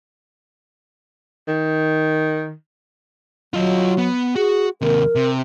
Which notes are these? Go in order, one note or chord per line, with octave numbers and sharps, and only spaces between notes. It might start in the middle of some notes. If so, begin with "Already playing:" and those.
D#3
F#3 F4 D#5
B3
F#4 G#4
D#2 C3 A#4
C3